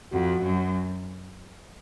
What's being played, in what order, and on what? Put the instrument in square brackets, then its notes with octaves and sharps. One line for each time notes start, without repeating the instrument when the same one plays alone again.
[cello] F2 [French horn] F#4
[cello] F#2